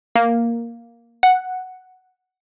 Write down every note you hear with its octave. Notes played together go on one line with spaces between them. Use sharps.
A#3
F#5